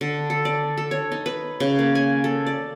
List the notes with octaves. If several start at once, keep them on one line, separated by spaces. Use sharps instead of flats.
D3
A4
D5
A4
C#5
D#4
B4
C#3
A#3
G#5
A4
D5